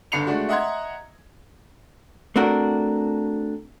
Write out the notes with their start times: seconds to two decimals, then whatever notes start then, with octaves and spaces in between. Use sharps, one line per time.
0.12 G1 D3 B5 C7 C#7 F7
0.27 G#3 A3 D4 F#4
0.49 D#5 E5 F#5 A#5 C6 G#6
2.36 A3 C4 D4 F#4 A#4